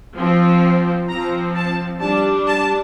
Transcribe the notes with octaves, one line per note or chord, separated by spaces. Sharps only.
F3 C4
F3 C4 A#5
A5
G3 D4 A5
A5